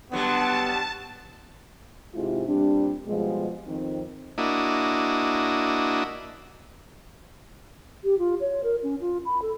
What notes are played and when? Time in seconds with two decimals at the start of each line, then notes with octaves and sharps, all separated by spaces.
0.12 D3 F#3 G3 B3 A5
2.14 G#2 C3 G#3 C4 E4 F4
2.47 A#2 G3 C4 D4
3.06 B2 F3 G3 G#3
3.66 F2 D#3 C4
4.38 A#3 D4 E4 F#4 D#5
8.04 G4
8.18 F4
8.40 C#5
8.63 A#4
8.83 C#4
9.01 F4
9.25 B5
9.42 A4